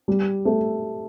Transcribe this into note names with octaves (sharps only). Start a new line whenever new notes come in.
G3
A3